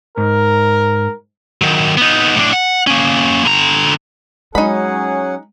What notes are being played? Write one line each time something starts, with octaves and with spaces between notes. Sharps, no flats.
G#2 A#4
D#3 F#3
B3 D#4
A2 D4
F#5
A#3 C#4
D3 A#5
F#3 G#3 C#4 D#4 G#4 F#5 B5